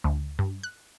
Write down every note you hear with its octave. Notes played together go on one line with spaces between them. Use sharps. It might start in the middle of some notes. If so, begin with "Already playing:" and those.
D2
G2
F#6